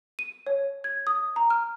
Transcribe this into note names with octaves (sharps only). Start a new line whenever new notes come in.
D#7
C#5
G#6
D#6
A#5
F6